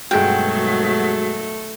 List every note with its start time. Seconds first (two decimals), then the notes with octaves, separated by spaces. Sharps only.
0.11 G2 B2 D#3 F#3 G#3 A3 F#4 G5